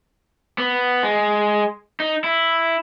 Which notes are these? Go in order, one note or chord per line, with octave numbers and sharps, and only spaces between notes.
B3
G#3
D#4
E4